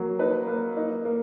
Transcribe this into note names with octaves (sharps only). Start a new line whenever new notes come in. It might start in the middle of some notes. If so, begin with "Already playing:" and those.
Already playing: F#3 A#3
D#4 B4
A#3
D#4
A#3